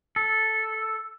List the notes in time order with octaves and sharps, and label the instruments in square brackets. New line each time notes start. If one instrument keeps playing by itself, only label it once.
[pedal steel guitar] A4